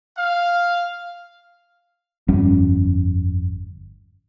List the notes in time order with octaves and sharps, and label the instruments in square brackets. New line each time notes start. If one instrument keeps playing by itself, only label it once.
[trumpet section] F5
[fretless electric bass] G1 F2 G3 C#4